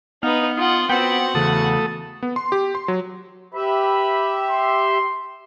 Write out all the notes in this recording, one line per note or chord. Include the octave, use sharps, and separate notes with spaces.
B3 D#4 B4 F5 F6
D#4 F4 F#5
B3 F#4 B4 C5 F#5 G5
E2 C#3 A3 A4 D#6
B3
C6
G4
C6
F#3
G4 B4 E5 B5
C6